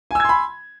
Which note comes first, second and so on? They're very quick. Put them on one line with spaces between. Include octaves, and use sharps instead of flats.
G#5 E6 G#6 C6 B5